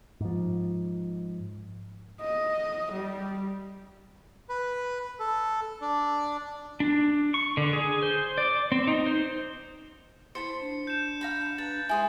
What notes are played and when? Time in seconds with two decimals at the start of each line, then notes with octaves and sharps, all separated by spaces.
0.20 G#2 F3
2.21 D#5
2.91 G3
4.49 B4
5.20 A4
5.81 D4
6.80 D4
7.34 C#6
7.57 D3
7.73 G#4
8.03 C5
8.38 D5
8.72 C4
8.87 D#4
9.06 C5
10.35 E4 C5 A5 B5 C#7
10.60 D4
10.87 G6 E7
11.21 F5 A#5 B5
11.58 B4 A6
11.89 G#3 E4 G#4 C5 G#5